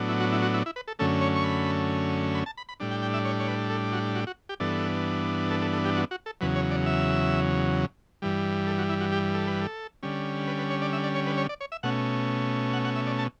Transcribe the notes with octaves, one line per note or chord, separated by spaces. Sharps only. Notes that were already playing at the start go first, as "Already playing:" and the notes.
Already playing: A2 F#3 B3 D4
E4
F#4
E4
F#4
E4
E4
B4
A4
F#2 D3 A3 C#4 A4
C#5
C#6
B5
B5
A5
B5
B5
A2 G3 D4
G5
G5
E5
C#5
C#5
B4
A4
F#4
F#4
F#4
G4
G2 E3 B3 D4 A4
A4
A4
A4
G4
F#4
F#4
A4
E2 C#3 F#3 B4
C#5
D5
E5
G2 E3 G3
A4
F#4
E4
F#4
G4
A4
B4
A4
D3 G3 C#4
B4
B4
C#5
D5
E5
D5
C#5
B4
C#5
D5
C#5
E5
B2 A3 C#4 F#5
F#5
F#5
E5
D5
A5